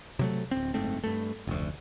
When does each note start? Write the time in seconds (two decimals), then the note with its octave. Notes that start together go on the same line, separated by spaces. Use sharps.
0.19 C3 F#3 A3
0.51 D1 C4
0.74 F#1 G#2 A3 C4
1.04 G2 A3
1.47 F1 D2